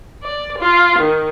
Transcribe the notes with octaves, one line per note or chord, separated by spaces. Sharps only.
D5
F4
D#3